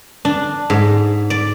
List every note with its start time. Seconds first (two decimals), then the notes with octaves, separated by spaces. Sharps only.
0.25 D4
0.70 G#2
1.30 D5